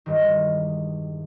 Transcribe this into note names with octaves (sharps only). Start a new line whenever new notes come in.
E1 G2 D#3